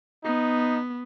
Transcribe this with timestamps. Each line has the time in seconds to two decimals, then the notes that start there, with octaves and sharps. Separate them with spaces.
0.25 B3 D#4